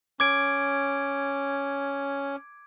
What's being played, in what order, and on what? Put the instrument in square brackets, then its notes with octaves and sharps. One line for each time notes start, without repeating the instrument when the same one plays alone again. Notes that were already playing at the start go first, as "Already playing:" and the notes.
[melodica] C#4 [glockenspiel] D6 G#6 D7